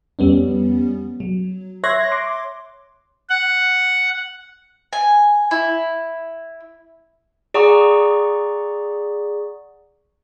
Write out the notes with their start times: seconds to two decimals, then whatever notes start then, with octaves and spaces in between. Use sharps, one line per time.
0.19 F2 G3 B3 C#4
1.20 F#3
1.84 C#5 E5 C6 F#6 G#6 A#6
2.12 C6 D6
3.30 F#5
4.93 G#5
5.51 E4
7.54 G#4 D5 F#5 A#5 C#6 D#6